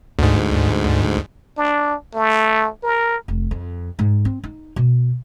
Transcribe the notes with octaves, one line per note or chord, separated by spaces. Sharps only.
D2 G#2
D4
A3
A#4
F1
F2
G#2
C4
D#4
B2